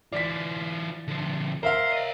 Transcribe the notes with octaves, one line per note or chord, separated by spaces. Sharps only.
E3 F4 D5 B6
D3 F3
A#4 C5 E5 F5
C#5 D#5